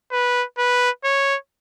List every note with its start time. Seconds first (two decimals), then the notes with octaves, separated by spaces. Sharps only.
0.12 B4
0.58 B4
1.04 C#5